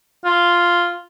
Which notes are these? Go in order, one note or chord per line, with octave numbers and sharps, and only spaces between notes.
F4